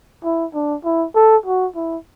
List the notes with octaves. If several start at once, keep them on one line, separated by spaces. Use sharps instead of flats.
E4
D4
E4
A4
F#4
E4